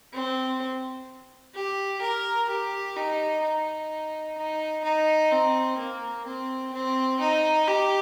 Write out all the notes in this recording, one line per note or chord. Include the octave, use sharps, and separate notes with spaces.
C4
G4
A#4
G4
D#4
D#4
D#4
D#4
C4
A#3
C4
C4
D#4
G4